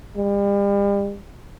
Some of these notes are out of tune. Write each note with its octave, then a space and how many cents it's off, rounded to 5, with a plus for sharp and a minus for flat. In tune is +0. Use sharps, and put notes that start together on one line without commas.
G3 +40